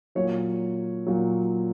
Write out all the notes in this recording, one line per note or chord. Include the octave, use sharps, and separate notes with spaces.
A#2 F#3 C#5
A#2 F#3